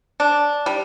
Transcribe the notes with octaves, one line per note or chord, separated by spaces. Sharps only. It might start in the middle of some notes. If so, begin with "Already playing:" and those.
D4
G3